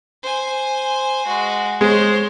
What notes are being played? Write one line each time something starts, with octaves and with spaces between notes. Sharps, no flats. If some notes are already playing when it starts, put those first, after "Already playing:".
C5 G#5
G#3 F#4
G#3 C5 C#5